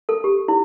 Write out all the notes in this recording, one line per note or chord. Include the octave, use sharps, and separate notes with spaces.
A4
G4
E4